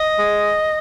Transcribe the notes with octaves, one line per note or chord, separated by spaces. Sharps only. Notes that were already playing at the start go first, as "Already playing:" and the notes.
Already playing: D#5
G#3